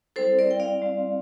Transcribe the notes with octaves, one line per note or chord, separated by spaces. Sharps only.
G3 C4 E4 A4 C5
A#4 D5
G5
D5 F5
G3 C4 E4